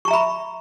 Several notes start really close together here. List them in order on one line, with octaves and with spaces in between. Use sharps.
C#6 A#5 E5 B5